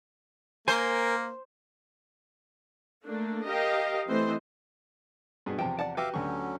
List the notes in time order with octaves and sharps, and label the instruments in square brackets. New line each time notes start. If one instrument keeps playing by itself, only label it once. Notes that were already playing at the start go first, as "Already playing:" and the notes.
[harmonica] A#3 [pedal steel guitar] A#4 G#5 [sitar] C5
[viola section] A3 A#3 D4
G4 A#4 D#5 F5 G5
E3 A3 C4 C5 D#5
[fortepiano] G2 B2 G#4
[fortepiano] E2 C3 F3 [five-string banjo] G5 A5
[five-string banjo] D5 F#5 A5
[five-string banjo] F#4 G4 B4 [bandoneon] E5 F5 D6
[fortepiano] D2 C#6 [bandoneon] D3 F#3 C#4